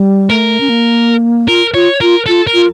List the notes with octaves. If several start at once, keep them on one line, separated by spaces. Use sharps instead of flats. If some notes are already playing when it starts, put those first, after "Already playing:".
Already playing: G3
A3 A#4
C#4
A#3
F4 A#4
F4 C#5
F4 A#4
F4 A4
A#4
F4